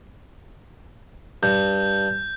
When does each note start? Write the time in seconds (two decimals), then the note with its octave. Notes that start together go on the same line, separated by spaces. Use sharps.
1.43 G2 G6